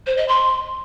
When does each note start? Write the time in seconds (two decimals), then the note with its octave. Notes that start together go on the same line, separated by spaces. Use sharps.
0.07 C5
0.17 D#5
0.28 C6